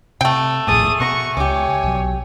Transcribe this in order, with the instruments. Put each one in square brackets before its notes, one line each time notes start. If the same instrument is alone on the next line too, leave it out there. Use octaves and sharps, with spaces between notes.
[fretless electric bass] C3 [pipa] A3 G5
[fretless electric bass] D#1 A#1 A2 [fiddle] G#4 D#6 [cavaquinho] D5 A5
[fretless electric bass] B2 [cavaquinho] F#5 A#5 [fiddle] C#6
[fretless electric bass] C#2 [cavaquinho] G4 D6 [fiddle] C#5 G#5
[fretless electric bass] B1 F#3